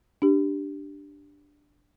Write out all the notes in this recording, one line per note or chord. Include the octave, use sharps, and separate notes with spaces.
D4 G4